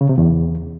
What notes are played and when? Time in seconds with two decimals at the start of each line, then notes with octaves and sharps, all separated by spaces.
0.01 C#3
0.09 C3
0.18 E2